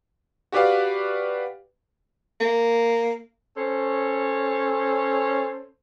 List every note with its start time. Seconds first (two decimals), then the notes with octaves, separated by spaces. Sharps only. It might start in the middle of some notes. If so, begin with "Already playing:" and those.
0.52 F#4 G4 B4 D5 F5
2.40 A#3
3.57 C#4 A4 C5 C#5